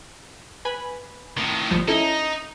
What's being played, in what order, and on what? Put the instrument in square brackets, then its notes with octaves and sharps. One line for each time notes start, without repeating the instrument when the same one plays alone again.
[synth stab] B4 G#5 B5
[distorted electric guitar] A2 D#3
[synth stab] G#1 F3 G3
[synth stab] C#4 E4 A4 [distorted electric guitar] D#4